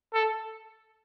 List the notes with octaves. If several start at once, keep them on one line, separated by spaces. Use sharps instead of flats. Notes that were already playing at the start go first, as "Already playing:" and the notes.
A4